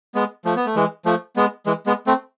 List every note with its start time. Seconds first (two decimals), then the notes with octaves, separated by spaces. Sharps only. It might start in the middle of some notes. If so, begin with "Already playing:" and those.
0.15 G#3 B3
0.45 F3 A3
0.56 B3
0.66 A3
0.76 E3 G#3
1.05 F3 A3
1.36 G#3 B3
1.66 E3 G#3
1.86 G#3 B3
2.07 A3 C4